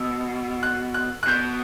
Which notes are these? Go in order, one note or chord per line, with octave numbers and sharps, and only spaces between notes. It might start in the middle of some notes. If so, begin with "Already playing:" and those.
Already playing: B2 E6
F#6
F#6
F#6
B2 G6